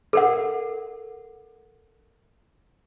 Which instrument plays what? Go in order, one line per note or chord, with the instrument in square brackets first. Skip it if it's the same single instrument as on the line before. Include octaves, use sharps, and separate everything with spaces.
[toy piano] A4 A#4 F#5